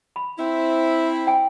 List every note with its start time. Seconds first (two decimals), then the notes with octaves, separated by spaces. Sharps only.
0.16 B5
0.38 C4 E4
1.27 G5 G#5